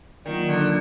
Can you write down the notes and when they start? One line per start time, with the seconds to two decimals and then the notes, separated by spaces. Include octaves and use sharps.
0.25 D#3 F#3 A#3 F4 A#4 D5
0.49 D3